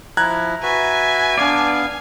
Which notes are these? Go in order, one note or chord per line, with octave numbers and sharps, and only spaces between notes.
F3 E4 A#5 F#6 G#6
F#4 B4 E5 G#5
B3 D4 D5 F5